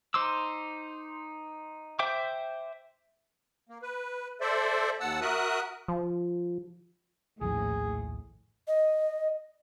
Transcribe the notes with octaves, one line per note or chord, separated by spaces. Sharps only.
D#4 C5 C6 D6 E6
C5 E5 G5 D6
A#3
B4
A4 C5 D5 E5
D#2 F#5 A5 E6
F#4 A#4 E5 D#6 F#6
F3
A#1 D#2 A2 F3 G#4
D#5